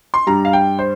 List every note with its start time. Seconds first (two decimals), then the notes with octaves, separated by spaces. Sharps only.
0.14 C6
0.27 G2 G3 A#5
0.45 F5
0.53 G5
0.79 C5